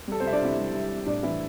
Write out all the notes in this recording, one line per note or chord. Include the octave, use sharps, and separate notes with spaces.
G3 A4
C4 C5
C3 E5
D4 D5
C3 E4 E5
G3
G3
C3
A2 D4 D5
E3 E4 E5